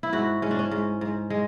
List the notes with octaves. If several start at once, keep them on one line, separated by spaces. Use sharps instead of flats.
E4
G#2 F#4
G#2 C#4
D4
C#4
G#2
G#2
G#3